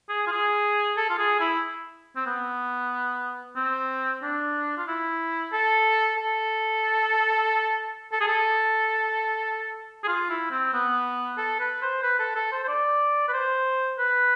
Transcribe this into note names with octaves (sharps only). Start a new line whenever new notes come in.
G#4
F4
G#4
A4
F4
G#4
E4
C4
B3
C4
D4
F4
E4
A4
A4
A4
G#4
A4
G#4
F4
E4
C4
B3
A4
B4
C5
B4
A4
A4
C5
C5
D5
B4
C5
B4